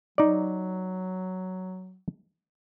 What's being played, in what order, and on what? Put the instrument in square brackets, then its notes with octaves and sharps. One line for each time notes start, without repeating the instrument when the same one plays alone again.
[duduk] F#3 [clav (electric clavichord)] D#4 D5